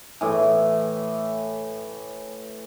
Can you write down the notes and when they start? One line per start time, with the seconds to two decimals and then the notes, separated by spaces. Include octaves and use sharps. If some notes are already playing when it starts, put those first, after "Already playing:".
0.21 A2 E3